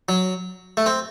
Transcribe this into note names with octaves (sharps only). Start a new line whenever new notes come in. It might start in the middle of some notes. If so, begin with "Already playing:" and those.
F#3
A3
C4